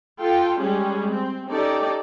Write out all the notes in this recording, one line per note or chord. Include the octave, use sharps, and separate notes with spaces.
F4 A4 G5
G3 G#3 C#4 G4 G#4
C4
C#4 D#4 G4 A4 D5